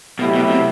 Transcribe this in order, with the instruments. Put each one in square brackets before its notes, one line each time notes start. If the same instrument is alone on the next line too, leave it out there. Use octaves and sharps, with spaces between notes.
[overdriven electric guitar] B2 [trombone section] F#3 A3 E4 G4
[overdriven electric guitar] B2
C3